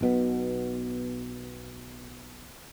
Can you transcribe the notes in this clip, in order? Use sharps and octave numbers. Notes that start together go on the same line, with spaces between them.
B1 B2 B3